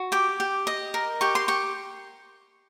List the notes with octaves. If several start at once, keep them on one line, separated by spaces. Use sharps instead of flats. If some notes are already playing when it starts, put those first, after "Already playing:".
Already playing: F#4
G4 D6
G4
D#5
A#4
G4 C#6
C6
G4 C#6